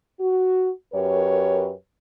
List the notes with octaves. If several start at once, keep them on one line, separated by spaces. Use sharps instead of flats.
F#4
F#2 G4 A#4 B4 C#5